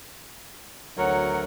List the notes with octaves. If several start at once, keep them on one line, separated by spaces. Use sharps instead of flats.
D2 F#3 A#4 C#5 F#5